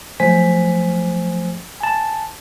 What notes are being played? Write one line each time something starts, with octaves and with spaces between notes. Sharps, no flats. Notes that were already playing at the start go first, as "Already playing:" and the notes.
F3 F#3 A3 C5 G#5 B6
G#5 A5